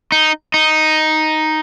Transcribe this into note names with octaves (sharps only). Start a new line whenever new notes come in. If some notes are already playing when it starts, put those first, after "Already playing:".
D#4
D#4